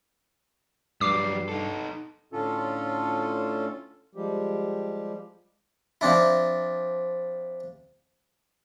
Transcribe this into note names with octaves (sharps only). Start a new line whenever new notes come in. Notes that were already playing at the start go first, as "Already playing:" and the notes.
G2 F#3 G3 D6 C7
D#4 A4
A2 D3 C#4 F4 A4
F3 G3 G#3 G4
F3 C4 D4 E4